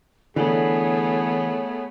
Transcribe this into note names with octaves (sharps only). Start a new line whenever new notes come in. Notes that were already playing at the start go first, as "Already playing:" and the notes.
D3 E3 A3 B3 G#4 C#5